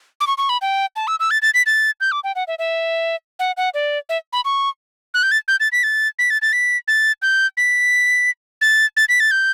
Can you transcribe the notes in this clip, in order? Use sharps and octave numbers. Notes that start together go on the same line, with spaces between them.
D6
C#6
C#6
B5
G5
A5
E6
E6
A6
A6
B6
A6
G6
D6
G5
F#5
E5
E5
F#5
F#5
D5
E5
B5
C#6
F#6
G6
A6
G6
A6
B6
A6
B6
A6
A6
B6
A6
G6
B6
A6
A6
B6
A6
G6